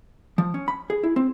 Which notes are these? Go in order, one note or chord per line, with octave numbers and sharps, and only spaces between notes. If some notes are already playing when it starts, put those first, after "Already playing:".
F3
C#4
B5
G#4
E4
C4